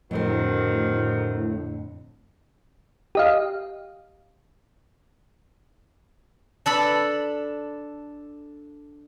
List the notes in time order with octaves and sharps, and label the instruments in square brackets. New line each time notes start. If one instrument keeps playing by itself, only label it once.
[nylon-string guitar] F2 D3 A#4 [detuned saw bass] A2 [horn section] D#3 F#3 C4
[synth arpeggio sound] G4 D#5 F5
[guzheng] D4 A4 B5